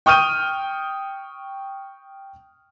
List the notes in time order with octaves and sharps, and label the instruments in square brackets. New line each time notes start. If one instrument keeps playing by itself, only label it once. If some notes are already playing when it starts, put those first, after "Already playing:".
[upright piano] G5 C#6 D#6 F6 G6 D#7